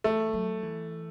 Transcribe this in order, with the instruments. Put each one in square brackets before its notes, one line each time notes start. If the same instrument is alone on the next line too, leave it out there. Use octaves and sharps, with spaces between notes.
[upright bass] E3 [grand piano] A3
[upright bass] F#3
E3